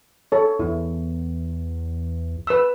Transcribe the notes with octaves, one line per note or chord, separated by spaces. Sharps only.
A4 C#5
E2 E4
B4 E6